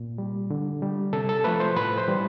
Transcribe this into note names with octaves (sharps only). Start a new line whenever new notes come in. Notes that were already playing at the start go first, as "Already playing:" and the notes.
Already playing: A#2
G3
D3
G3
C3 A4
A4
F3 A3 B4
C5
A2 B4
C5
E3 G3